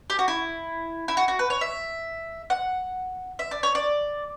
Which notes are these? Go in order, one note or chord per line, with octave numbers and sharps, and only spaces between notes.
G4
F#4
E4
E4
F#4
F#4
B4
C#5
E5
F#5
E5
D5
C#5
D5